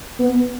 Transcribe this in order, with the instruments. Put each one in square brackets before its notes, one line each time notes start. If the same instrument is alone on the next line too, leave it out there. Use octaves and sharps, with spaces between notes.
[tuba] B3